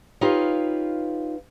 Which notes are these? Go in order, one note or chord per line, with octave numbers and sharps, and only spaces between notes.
D#4 F4 G4 B4 C#5 F5